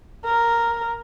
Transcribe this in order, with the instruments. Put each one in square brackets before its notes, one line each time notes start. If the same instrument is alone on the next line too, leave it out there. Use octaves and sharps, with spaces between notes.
[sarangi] A#4